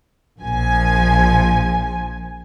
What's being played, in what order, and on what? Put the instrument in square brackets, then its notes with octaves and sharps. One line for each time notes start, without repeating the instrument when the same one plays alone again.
[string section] A#1 F3 G#5